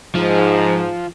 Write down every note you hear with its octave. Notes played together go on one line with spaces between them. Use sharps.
G#2 F3